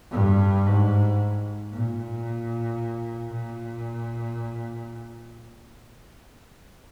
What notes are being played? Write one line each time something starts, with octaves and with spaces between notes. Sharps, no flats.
G2
G#2
A#2
A#2